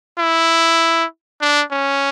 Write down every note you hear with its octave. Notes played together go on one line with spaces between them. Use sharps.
E4
D4
C#4